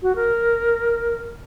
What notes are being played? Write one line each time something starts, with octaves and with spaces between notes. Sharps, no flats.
F#4
A#4